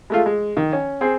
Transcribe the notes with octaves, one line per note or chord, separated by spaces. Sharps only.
G#3 A3 F4
G#3
D#3
C#4
C4 G#4 C5